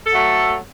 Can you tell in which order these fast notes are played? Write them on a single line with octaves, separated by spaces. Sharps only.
A4 F#3 A3